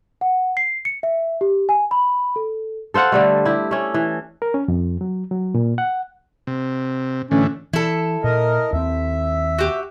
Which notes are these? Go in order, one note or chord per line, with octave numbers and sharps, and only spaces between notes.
F#5
C7
C#7
E5
G4
G#5
B5
A4
A4 C5 F5 F#5
D3 G3 A3
E4 G4
A3 C#4
E3
A#4
C#4
F2
F#3
F#3
A#2
F#5
C3
A2 D3 E3 C#4
E3 E4 A4
A#2 A#4 D#5
D#2 C4 E5
F#4 G4